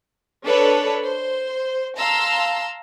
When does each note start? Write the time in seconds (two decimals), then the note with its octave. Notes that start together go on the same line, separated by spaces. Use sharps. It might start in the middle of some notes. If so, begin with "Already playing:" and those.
0.45 D4 A4 B4 C#5
1.05 C5
1.98 F5 A5 A#5 C6 E6